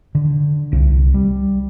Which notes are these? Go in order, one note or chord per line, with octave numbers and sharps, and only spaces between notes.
D3
C2
G3